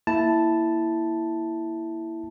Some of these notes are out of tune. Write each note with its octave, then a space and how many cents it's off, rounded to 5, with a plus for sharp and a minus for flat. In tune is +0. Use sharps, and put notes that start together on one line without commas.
A#3 +0 E4 +0 A5 +0